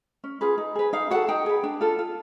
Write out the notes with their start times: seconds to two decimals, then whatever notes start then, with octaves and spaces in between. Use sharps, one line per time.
0.24 C#4
0.41 F4 G#4 B4
0.58 D#4
0.75 G#4 B4
0.93 D#4 F5
1.10 F#4 A4 F#5
1.28 D#4 G5
1.46 G#4 B4
1.63 D4
1.81 F4 A4
1.99 F4